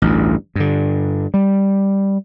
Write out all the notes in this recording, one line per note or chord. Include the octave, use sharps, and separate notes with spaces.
A1 D2 G2
G2 D3
G3